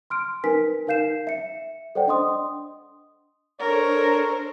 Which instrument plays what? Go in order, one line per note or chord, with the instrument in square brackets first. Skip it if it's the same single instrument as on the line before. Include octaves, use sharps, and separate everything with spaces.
[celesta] C6 F6 D7
D#4 A#4 B4 G#5 B6
D#4 A#4 F5 G6 C7 E7
E5 C#7
A4 C5 D5 F#5 G5
D4 D#5 C6 D#6
[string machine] D4 A4 C5 [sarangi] A#4 [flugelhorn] C#5